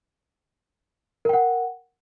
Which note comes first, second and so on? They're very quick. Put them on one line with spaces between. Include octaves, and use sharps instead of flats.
A#4 G5 F#5